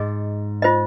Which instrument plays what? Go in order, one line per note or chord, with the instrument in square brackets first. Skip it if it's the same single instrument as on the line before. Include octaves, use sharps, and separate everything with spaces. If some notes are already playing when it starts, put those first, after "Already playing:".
Already playing: [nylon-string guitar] G#2 [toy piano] G#4 D#5
[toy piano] F4 C5 D#5